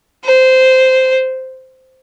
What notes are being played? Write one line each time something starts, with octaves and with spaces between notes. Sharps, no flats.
C5